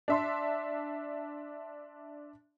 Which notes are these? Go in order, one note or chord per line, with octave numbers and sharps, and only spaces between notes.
D4 E5 C6